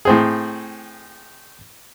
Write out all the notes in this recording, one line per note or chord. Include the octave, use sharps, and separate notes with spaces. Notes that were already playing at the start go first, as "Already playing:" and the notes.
A2 C4 G#4